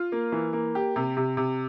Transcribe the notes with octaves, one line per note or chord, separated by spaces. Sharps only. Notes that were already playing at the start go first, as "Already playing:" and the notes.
Already playing: F4
A#3
E3
A#3
G4
C3
C3
C3